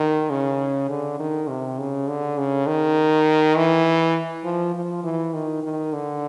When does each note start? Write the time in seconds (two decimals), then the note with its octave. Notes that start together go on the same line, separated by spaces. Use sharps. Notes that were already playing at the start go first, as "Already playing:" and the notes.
Already playing: D#3
0.30 C#3
0.89 D3
1.19 D#3
1.49 C3
1.78 C#3
2.08 D3
2.38 C#3
2.67 D#3
3.56 E3
4.44 F3
4.74 F3
5.03 E3
5.33 D#3
5.63 D#3
5.93 D3